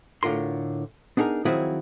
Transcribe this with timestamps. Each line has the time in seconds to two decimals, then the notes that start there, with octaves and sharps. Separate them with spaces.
0.23 A2 D3 F4 A#4 C6
1.17 B3 D4 D#4 G#4 A#4
1.45 D#3 F3 F#3 C4 E4 G#4